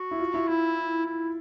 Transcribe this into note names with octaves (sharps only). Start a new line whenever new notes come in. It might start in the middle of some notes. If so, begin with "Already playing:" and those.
Already playing: F#4
E4
F4
E4
E4 F4
E4